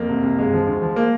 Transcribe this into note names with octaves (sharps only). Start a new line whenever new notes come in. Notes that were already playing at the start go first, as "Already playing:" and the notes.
Already playing: F2 A#3
C2
C2
G1 G#3
F3
D2
F3
A#3